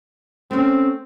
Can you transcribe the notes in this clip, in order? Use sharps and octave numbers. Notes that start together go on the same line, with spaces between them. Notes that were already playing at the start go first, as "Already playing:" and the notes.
A3 C4 C#4